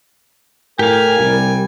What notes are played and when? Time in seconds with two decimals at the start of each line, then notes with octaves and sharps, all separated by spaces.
0.79 A2 G4 A#4 F5 G#5
1.20 C2 G3